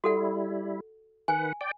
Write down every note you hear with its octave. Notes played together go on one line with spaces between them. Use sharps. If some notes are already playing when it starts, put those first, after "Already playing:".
G3 E4 F#4 A4 F#5
D#3 B4 F#5 G#5
D5 G5